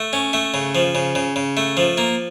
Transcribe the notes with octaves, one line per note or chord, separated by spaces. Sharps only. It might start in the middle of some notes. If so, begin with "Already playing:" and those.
Already playing: A3
C#4
A3
C#3
F3
C#3
C#3
C#3
A3
F3
A#3